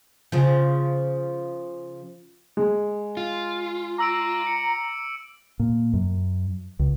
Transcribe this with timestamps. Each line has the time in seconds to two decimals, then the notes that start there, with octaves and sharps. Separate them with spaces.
0.32 C#3 F3
2.57 G#3
3.17 F4
3.98 A#5 D6 E6 D7
4.47 C#7
5.60 A#2
5.94 F#2
6.79 C#2